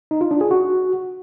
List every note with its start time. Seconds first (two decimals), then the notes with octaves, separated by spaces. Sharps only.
0.11 D#4
0.21 F4
0.31 D4
0.41 G#4
0.51 F#4